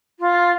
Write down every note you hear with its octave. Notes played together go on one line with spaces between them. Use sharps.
F4